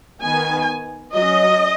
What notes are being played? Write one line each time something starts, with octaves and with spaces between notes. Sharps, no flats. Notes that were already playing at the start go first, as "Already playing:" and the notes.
D#3 B3 G#5
F#3 C#4 D#5